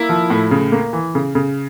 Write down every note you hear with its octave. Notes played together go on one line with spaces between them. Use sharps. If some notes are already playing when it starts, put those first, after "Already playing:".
Already playing: A#3 E4
F3
A2
C#3
A#3
E3
C#3
C#3